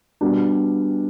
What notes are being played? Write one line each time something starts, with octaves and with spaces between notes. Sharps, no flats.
B2 G3 D4